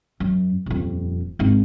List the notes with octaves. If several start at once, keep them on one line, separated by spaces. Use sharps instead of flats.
F#2
D#1 F2
G#1 D#4